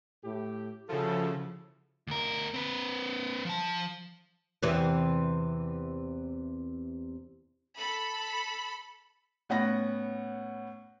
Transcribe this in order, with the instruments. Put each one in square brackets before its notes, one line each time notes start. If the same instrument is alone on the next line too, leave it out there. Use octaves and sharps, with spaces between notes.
[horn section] A2 G4
[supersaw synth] C#3 F3 [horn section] E4 F#4 A4
[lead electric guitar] D2 A#4
C4 B4
F3 A5
[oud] E2 C3 E3
[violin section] A4 B5
[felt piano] A2 B3 C#4 F#5 B5 A#6